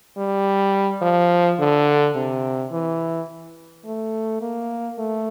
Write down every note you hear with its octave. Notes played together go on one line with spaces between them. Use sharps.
G3
F3
D3
C3
E3
A3
A#3
A3